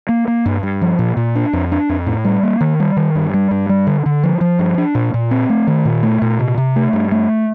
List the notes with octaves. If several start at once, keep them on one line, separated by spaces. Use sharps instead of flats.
A#3
A#3
G2
G2
F3
A#2
A#2
D4
F2
D4
F2
A2
G3
A#3
D#3
G3
D#3
G2
G3
G2
G3
D3
D3
F3
F3
G2
D4
A#2
A#2
C4
A3
D#3
A#2
A3
A#2
C3
C3
A3
G2
A3